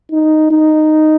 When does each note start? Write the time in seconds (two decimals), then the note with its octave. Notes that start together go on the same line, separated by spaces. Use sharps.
0.12 D#4
0.51 D#4